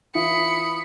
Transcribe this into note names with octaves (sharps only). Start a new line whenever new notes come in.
E3 E4 F4 B5 D#6 C#7